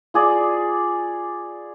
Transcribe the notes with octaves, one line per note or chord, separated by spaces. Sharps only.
F4 G#4 D5